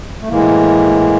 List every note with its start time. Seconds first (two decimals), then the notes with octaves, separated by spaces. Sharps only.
0.21 A3
0.28 A2 E3 G#3 A#3